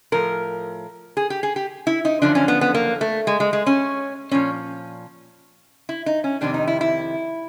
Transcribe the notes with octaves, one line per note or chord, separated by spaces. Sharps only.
A2 F3 A#4
G#4
G4
G#4
G4
E4
D#4
F#2 D3 F3 D4
C#4
B3
B3
A#3
A3
G#3
G#3
G#3
C#4
A#2 F3 C#4
E4
D#4
C#4
F2 C3 D#3 D4
D#4
E4
E4